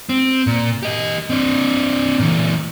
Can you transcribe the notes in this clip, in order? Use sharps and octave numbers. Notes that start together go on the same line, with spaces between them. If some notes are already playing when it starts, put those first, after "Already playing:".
C4
A#2
G4 D#5
C4 D4
A#2 E3